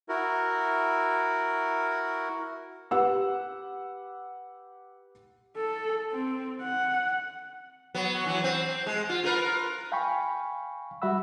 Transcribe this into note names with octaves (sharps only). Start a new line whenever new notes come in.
E4 F#4 A#4
G4 B4 F#5 E6
A4
C4
F#5
F#3 B3
E3 F#3
C4
G#3
F4
F4 A#4 B4
F5 G5 G#5 B5 C#6
G3 F#4 E5 F#5 B5 E6